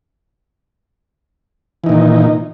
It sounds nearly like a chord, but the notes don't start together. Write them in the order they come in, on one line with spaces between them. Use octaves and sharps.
E3 D#4 A#2 D#3